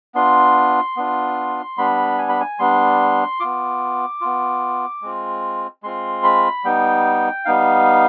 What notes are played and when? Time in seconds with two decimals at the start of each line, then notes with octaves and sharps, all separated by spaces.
0.15 B3 D4 F4 C6
0.97 B3 D4 F4
1.77 G3 B3 D4 B5
2.18 G#5
2.29 B5
2.40 G#5
2.59 G3 B3 D4 C6
3.40 B3 F4 D6
4.21 B3 F4
5.02 G#3 C4 F4
5.83 G#3 C4 F4 C6
6.24 B5
6.64 G3 B3 D#4 G5
7.45 G3 B3 D#4 F5